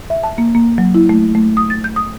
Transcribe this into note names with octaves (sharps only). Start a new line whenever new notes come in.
E5
A5
A#3
A#3
F#3
E4
A3
A3
D#6
A6
G6
D#6